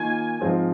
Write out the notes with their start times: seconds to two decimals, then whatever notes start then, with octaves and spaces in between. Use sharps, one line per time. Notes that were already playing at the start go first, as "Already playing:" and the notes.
Already playing: D#3 A#3 F4 G#5
0.40 G#2 F3 C4 F4 G#4